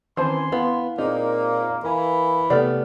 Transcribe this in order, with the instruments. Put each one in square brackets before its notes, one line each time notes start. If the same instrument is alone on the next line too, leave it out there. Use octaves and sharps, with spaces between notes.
[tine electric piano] D#3 C4 C#4 [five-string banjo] E3 C5 A5 [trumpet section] G#5 C6
[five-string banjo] B3 [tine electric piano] E4 F5
[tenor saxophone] A#2 [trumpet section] A#3 [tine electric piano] C4 G#4 C5 [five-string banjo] D#4
[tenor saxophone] E3 [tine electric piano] A#4 F5 G#5 [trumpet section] B5
[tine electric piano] C3 G4 F6 [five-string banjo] A3 B3 D5